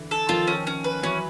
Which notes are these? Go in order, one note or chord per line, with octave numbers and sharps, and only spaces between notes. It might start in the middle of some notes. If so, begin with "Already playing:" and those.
Already playing: D3 E3
A4
D#3 F3 F4
C#4
C#4
B4
E3 F#3 C#4